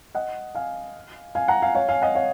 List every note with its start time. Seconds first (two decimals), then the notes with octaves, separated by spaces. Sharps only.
0.15 D#5 F#5
0.55 F5 G#5
1.35 F5 G#5
1.48 F#5 A#5
1.62 F5 G#5
1.75 C#5 F5
1.89 F5 G#5
2.02 D#5 F#5
2.15 C#5 F5